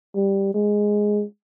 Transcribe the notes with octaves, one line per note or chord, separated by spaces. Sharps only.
G3
G#3